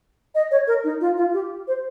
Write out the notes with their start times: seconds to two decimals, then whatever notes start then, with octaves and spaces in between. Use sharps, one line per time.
0.35 D#5
0.51 C#5
0.67 A#4
0.84 D#4
1.01 F4
1.17 F4
1.33 G4
1.68 C5